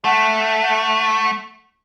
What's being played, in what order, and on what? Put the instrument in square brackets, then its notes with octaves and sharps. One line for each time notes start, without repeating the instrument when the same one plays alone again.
[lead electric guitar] A3 [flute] F#5